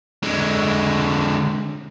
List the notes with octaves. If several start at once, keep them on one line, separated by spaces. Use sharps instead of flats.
D3 G#3